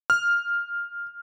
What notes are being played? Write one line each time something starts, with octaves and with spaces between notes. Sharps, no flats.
F6